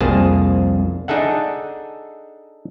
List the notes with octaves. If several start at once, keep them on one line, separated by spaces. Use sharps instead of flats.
C2 F2 A#3 G#4 C5 A5
D4 D#4 G#4 A4 E5 F#5